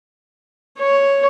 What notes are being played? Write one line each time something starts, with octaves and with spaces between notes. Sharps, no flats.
C#5